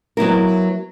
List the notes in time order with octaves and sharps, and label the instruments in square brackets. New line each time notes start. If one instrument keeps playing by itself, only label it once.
[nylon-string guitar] F#3 B3 E4 A#4